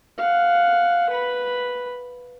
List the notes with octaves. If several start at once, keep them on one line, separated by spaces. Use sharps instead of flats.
F5 F#5
B4 B5